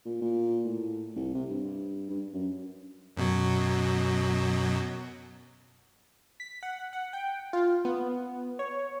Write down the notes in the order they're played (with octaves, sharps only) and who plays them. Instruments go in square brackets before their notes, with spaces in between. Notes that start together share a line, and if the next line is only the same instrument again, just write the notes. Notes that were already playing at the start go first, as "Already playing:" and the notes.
[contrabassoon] A#2
A#2
A2
C2
C3
G2
G2
F#2
[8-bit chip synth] F#2 B2 F#3
[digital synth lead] B6
F#5
F#5
G5
F4
B3
C#5